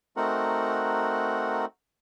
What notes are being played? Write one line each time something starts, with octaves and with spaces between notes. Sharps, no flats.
A3 C4 D#4 F#4 A#4 F#5